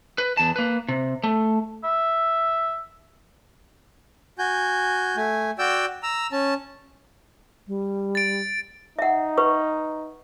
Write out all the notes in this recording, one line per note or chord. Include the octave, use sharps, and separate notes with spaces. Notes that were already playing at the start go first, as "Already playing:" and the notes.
B4
E2 A5
A#3 B4
C3
A3
E5
F#4 G#5 G6
A3 G#5
F#4 D5 G5 E6 G6
A#5 E6
C#4 A5
G3
A6 D7
D#4 E5 F#5
B4 C#6